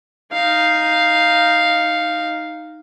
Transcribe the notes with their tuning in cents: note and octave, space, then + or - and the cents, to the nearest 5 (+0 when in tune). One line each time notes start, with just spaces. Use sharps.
D#4 +0 F5 +0